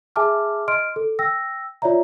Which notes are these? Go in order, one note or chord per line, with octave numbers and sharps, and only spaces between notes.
G#4 E5 G#5 A5 D6 F6
D#5 C6 F6 D7
A4
G5 E6 A#6
F4 C#5 D5 E5 A#5